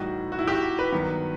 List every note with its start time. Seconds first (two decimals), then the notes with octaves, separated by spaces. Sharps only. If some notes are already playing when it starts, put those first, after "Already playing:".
Already playing: A2 E3 G3 D#4 F#4
0.32 F#4
0.39 E4
0.48 G4
0.52 F#4
0.79 B4
0.92 G2 D#3 F#3 B3